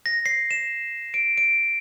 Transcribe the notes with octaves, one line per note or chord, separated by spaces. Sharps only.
A#6
C7
E7
D7
D7